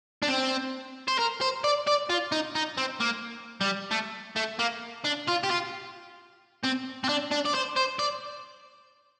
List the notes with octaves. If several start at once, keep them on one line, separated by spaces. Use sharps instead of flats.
D4
C4
C5
A#4
C5
D5
D5
F4
D#4
D#4
C4
A#3
G3
A3
A3
A#3
D4
F4
G4
F4
C4
C4
D4
D4
D5
C5
C5
D5